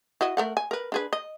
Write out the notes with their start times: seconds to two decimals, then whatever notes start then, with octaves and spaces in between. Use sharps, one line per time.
0.21 E4 F#4 D#5
0.37 A3 A#4 F#5
0.57 G#5
0.71 A#4 B4
0.92 D4 G#4 B4
1.13 D#5